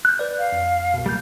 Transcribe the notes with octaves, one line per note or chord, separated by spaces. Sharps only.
F#6 G6
B4 D5
F5
F2
C2 B2
G3 A#3 G6